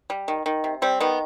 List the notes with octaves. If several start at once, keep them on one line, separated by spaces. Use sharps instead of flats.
G3
D#3
D#3
C3
G3 C4
D#3 B3